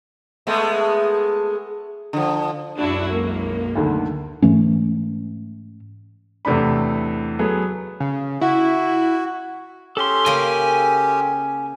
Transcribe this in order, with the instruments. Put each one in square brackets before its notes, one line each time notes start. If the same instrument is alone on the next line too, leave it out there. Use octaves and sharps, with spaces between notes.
[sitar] G#3 A3 B3
D3 F3
[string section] B1 F#2 G#3 [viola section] D4 E4 F#4
[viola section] A#3
[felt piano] D2 D3 D#3
[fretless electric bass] G#2 E3 A3 C#4
[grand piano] E2 A2 C3 A3 D4 B5
F#3 B3 G#4 A4
[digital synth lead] C#3
[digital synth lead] E4 [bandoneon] F#4
[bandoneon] C#4 G4 [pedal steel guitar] A4 C6
[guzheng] C#3 A#3 [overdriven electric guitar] G#5